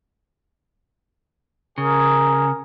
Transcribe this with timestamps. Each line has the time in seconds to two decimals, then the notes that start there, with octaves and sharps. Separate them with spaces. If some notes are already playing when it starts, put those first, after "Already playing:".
1.78 C#3 G#4 A#4